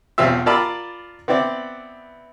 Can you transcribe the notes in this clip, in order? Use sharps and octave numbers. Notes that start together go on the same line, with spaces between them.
B1 E2 C4 F4 E5
F4 A#4 D5 A5 B5 E6
B3 C4 E4 D5